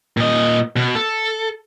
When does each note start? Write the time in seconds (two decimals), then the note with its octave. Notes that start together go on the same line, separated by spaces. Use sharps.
0.17 A#2 D#5
0.76 B2
0.95 A4